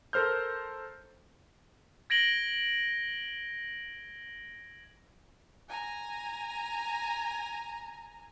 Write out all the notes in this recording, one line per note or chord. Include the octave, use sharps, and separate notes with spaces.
A4 A#4 C5 F6 G6
G#6 A#6 D7 F#7 G7
G#5 A#5